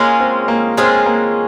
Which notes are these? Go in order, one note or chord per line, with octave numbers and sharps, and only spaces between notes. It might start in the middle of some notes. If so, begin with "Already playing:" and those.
Already playing: G#3 A#3 C#4 F4 G#4
C4
A#3
G#3 C4 C#4 F4 G#4
A#3